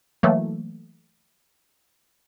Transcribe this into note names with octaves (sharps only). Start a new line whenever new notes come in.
E3 F#3 A3 A#3